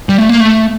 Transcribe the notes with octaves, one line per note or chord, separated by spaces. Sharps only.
G3
A3
A#3
A3